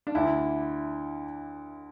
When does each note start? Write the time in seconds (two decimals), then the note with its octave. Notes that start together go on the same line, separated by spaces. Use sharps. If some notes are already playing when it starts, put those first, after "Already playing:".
0.07 D4
0.15 D2 D3 E4